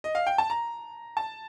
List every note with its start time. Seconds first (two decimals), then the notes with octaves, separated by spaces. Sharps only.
0.04 D#5
0.15 F5
0.27 G5
0.38 A5
0.50 A#5
1.17 A5